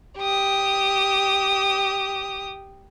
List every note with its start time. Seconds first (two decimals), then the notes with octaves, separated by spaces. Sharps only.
0.18 G4 D#6